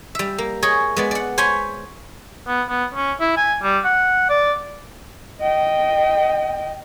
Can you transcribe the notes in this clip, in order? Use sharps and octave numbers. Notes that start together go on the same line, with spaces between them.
G3 E5
A#3
G#4 C#5 D#5
G#3 B3 D5
D5 F#5
C5 C#5 G#5 B5 C6
B3
B3
C#4
E4
G#5
G3
F#5
D5
D#5 G5